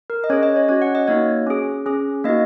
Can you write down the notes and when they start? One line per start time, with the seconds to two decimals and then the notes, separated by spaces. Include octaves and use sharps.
0.10 A#4
0.24 D#5
0.30 C#4 C#5
0.32 G#4
0.43 D#5
0.56 C#5
0.69 C#4 F#4 C#5
0.82 F#5
0.95 D#5
1.08 A#3 D#4 F#4 C#5
1.47 C#4 G#4
1.86 C#4 G#4
2.24 A#3 D#4 F#4 D#5